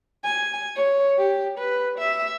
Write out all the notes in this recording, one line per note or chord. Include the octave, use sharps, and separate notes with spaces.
G#5
C#5
G4
B4
E5